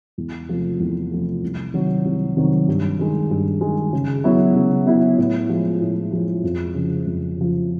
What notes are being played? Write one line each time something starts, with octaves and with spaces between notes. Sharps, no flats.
E2
C3 F3 A3
E2
C3 F3 A3
C2
C3 D#3 F#3
C2
C3 D#3 F#3
G2
D#3 G#3
G2
D#3 G#3
C#3
F#3 B3 E4
C#3
F#3 B3 E4
A2
F3 G#3
A2
F3 G#3
F2
C#3 F3
F2
C#3 F3